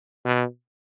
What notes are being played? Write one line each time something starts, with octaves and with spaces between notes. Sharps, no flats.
B2